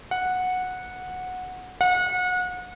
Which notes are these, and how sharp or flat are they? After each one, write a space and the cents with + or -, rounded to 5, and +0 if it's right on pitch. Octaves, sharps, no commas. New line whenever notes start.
F#5 -10
F#5 -30